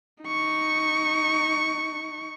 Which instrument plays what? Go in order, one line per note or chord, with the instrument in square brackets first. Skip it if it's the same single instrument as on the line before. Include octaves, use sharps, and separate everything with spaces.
[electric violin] D#4 C#6